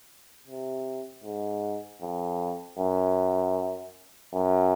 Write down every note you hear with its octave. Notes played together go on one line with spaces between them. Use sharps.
C3
G#2
F2
F#2
F#2